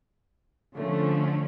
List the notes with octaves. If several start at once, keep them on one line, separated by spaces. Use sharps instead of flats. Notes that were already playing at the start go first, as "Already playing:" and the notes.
D3 F3 A3 C#4